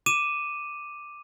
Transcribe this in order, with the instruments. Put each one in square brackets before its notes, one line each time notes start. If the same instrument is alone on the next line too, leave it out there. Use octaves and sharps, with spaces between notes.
[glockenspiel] D6 D#7 E7